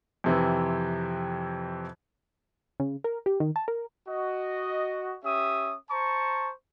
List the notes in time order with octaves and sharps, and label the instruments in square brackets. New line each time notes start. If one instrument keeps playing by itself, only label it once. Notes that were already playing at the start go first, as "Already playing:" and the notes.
[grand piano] F2 C3 E3
[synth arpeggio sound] C#3
A#4
G4
D#3
A5
A#4
[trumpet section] F#4 D#5
C#4 G4 E5 D#6
C5 A5 A#5 C#6